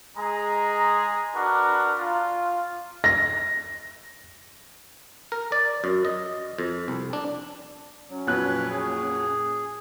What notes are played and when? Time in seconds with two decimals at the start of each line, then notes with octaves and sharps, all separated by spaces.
0.17 G#3 G#4 A#5
1.35 D4 F#4 A#4 B4
1.99 F4
3.04 A#6
5.32 A#4
5.52 D5
5.84 F#2
6.05 D#5
6.58 F2
6.88 C2
7.13 D4
8.09 F#3 C#4
8.27 F2 A#2 F#3 B4 F#6
8.71 G#4